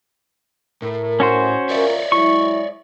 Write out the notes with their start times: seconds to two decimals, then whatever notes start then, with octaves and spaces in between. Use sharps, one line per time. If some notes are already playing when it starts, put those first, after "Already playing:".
0.82 A2 A#4
1.20 C#4 F#4 C5
1.69 F4 A#4 C#5 D5 E5
2.12 F#3 G#3 E4 C#6